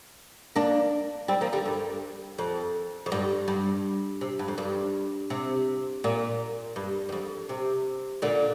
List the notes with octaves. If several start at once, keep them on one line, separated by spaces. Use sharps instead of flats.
A#3 D4
G3 C4
F3 A#3
D3 G3
G2
F2
F2
G2
G2
C3
G2
F2
G2
C3
A#2
G2
G2
F2
C3
A#2 D3